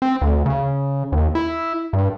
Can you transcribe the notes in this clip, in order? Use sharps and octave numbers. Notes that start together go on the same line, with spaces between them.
C4
D2
C#3
D#2
E4
G2